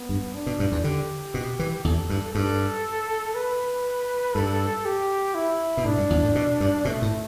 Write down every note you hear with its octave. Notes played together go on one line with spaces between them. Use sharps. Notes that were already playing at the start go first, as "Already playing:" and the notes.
Already playing: B3
G2
D4
B2
G2
E2
D3 G4
B2
E3
E2 A4
G2
G2 A4
B4
G2 A4
G4
E4
B2
A2 D4
G2
E2
A2
B2
G2
B2 A3
A2